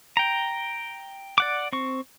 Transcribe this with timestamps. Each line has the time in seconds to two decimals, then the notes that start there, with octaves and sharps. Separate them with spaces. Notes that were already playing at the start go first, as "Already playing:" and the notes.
0.17 G5 A#5
1.38 D5 F#5 D6
1.73 C4 C#6